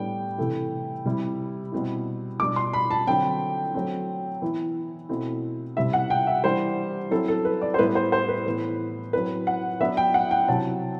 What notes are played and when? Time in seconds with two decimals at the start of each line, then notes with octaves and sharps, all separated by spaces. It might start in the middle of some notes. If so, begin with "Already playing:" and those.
Already playing: A2 G3 B3 D4 G5
0.38 C3 E3 A3 E4
1.05 C3 G3 C4 E4
1.72 B2 G3 C4 E4
2.40 B2 G3 D4 D6
2.56 C6
2.73 B5
2.91 A5
3.07 D3 F#3 C4 G5
3.75 F#3 A3 C4
4.42 E3 B3 E4
5.09 B2 A3 C4 E4
5.76 C3 G3 C4 E4 E5
5.93 F#5
6.10 G5
6.27 E5
6.44 E3 G3 D4 C5
7.11 F#3 C4 E4 A4
7.28 A4
7.45 B4
7.62 D5
7.74 C5
7.78 A2 G3 B3 E4 B4
7.95 C5
8.12 C5
8.29 B4
8.46 A2 E3 B3
9.13 F#3 C4 E4 B4
9.47 F#5
9.81 F#3 B3 D4 E5
9.97 G5
10.14 F#5
10.31 G5
10.48 C3 F#3 C4 E4 A5